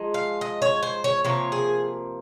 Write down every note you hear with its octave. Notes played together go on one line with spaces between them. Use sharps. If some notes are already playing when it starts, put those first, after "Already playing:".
Already playing: F3 G#3 D#4
F5
D#5
C#5
C5
C#5
C3 F3 A#3 C#5
G#4